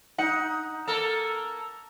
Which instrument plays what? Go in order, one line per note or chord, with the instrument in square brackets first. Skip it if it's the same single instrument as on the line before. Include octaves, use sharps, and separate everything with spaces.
[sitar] D#4 [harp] F#5
[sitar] A#3 A4 A#4